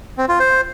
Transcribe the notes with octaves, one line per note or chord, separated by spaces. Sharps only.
C4
F4
C5